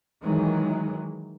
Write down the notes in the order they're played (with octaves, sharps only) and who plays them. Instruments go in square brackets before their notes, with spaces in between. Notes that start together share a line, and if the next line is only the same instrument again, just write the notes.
[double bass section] D#3 E3 F#3 G#3